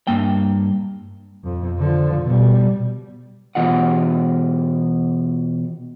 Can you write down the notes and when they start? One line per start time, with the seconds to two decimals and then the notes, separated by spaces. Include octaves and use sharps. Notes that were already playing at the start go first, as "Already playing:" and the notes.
0.07 G2 A#3 G5
1.44 F2
1.79 D3 F3
2.23 B2 G3
3.55 B2 E3 F4 D#5 F#5